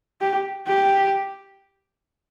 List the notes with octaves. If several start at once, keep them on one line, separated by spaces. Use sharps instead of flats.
G4
G4